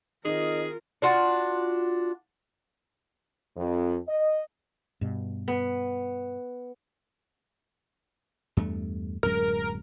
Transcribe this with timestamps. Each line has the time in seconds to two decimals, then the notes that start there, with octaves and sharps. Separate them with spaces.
0.25 D#3 C4 F4 G#4 A#4 D#5
1.02 D4 F4 F#4
3.56 F2
4.08 D#5
5.01 G2 B2
5.48 B3
8.57 E2 G2 A3
9.23 D1 F#2 G#3 A#4